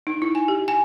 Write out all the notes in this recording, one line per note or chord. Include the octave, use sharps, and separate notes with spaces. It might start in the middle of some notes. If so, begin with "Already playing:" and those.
D#4
E4
G#5
G4
G#5